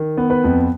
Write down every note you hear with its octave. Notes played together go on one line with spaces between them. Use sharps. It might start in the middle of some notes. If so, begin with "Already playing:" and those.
Already playing: D#3
B3
B4
F2